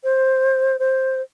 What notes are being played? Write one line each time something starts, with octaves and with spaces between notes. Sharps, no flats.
C5
C5